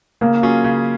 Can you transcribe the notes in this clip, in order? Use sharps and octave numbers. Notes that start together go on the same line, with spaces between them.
C#3 A#3
F#3 C#4 F4 G#4
C#3